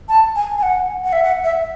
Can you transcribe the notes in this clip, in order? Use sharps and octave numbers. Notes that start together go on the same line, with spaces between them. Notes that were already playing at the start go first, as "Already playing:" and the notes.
A5
G#5
G#5
F#5
F#5
E5
F#5
E5